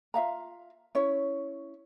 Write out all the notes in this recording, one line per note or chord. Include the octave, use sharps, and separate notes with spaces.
F4 E5 F5 A#5
C#4 E4 C#5